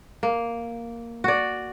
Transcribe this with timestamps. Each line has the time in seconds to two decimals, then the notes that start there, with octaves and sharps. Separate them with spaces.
0.23 A#3
1.24 F#4 D5